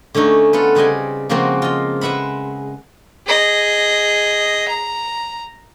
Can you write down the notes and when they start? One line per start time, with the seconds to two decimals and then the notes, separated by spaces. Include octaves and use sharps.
0.15 D3 A3 C#4 D#4
0.53 B3 F4 A4 B4
0.75 C#3 G3 C4 D#5 G#5
1.29 C#3 F3 G#3 A#3 C4 F#4
1.62 F4 D#5
2.01 G#3 B4 E5 F#5 B5
3.26 G#4 D#5
4.68 A#5